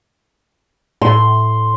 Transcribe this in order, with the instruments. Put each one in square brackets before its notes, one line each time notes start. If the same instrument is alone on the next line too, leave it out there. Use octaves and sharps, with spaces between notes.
[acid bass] A2 [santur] C6